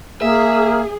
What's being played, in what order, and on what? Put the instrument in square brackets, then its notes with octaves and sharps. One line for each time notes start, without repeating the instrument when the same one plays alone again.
[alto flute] A#3 [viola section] G#4 [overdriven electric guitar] E5